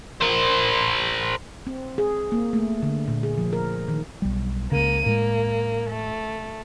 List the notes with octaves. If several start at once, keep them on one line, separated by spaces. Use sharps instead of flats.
A#4 C5
C4
G#4
A#3
A3
D3
A#2
G#4
F3
A#4
D#3
B1 G3
C#2 C#3 A#3 D#7
A2 G#3 A#3
A3